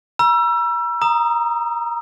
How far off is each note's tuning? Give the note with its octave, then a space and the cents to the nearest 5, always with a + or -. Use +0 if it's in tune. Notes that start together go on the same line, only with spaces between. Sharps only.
A#5 +45 E6 +30
A#5 +10 D#6 +0